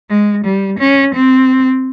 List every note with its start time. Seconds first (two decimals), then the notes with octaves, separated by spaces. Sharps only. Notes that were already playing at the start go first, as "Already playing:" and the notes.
0.10 G#3
0.45 G3
0.79 C#4
1.14 C4